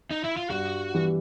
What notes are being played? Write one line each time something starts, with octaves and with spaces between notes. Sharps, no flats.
D#4
E4
F4
G2 F#4
E3 G3